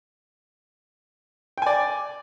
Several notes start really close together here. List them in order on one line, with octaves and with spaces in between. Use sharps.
G5 G#5 D5